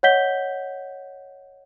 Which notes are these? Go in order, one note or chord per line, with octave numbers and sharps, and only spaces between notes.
C#5 D#5 F#5 G6 B6 G7